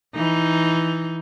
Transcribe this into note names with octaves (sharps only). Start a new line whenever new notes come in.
E3 D#4